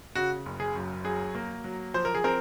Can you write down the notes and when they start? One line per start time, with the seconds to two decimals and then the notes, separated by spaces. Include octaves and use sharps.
0.15 C#3 F#4
0.46 F#1
0.60 G#4
0.76 F#2
1.04 F#3 G#4
1.35 A#3
1.64 F#3
1.94 F3 C5
2.05 A#4
2.15 G#4
2.24 C4 A#4